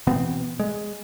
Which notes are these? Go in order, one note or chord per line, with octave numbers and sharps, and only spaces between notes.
B2 E3 B3 C4
G#3